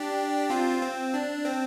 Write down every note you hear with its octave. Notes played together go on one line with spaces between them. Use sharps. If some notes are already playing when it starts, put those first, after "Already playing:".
Already playing: D4 G4
C4 F4
C4
D4
C4